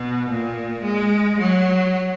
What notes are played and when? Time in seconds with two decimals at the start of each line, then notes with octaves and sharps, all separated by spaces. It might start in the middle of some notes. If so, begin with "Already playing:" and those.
Already playing: B2
0.28 A#2
0.83 G#3
1.39 F#3